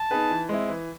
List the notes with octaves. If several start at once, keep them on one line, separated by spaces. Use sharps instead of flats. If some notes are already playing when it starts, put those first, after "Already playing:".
Already playing: A5
B3 D#4 G#4 B4
E3
G#3 C4 E4
E3